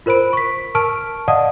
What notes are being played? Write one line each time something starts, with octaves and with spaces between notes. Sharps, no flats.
F4 A#4 C5 B5 D7
C#6 B6
A#4 A5 C#6 F6 D7
D5 D#5 F5 F#5 A5 D#6